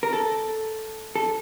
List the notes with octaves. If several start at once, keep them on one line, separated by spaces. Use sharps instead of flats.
A#4
A4
A4